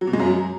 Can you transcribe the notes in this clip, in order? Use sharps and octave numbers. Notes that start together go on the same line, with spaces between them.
F#3
B2
G#3
F#2
F#3